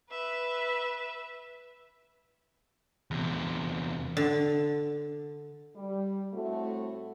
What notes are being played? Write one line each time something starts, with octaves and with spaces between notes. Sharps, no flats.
B4 E5
E2 C3
D3
G3
A2 A3 C4 E4 F#4